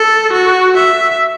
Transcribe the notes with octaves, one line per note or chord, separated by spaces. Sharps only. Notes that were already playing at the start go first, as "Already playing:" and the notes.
Already playing: A4
F#4
E5